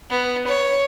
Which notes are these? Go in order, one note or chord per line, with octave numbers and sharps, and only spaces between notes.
B3
C#5